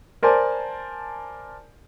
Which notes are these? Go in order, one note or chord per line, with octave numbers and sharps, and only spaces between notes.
A#4 C5 D5 G#5 A5